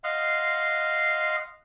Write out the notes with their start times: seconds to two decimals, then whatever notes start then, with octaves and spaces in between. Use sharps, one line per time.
0.04 D#5 F5 F#5 C6